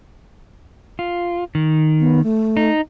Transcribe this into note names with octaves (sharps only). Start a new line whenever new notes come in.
F4
D#3
B3
A3
D#4